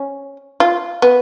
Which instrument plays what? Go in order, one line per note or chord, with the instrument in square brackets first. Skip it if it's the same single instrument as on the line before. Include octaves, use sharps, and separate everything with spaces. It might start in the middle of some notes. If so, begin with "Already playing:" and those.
Already playing: [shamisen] C#4
F4
B3